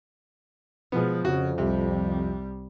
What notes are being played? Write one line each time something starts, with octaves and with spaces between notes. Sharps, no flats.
B2 F3 G#3 B3
F2 C#3 F#4
C2 C3 G3